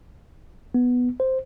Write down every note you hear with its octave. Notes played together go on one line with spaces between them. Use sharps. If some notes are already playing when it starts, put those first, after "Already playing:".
B3
C5